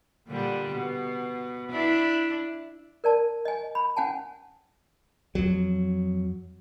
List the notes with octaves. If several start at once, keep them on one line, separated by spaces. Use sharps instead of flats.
A#2 D3 G3
B2
D4 E4
A#4 D5 A5
D#5 G#5
B5
C#4 F#5 G#5 A5
F2 F#3